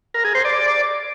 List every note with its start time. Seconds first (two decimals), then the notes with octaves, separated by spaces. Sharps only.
0.14 A#4
0.25 G#4
0.35 C5
0.45 D5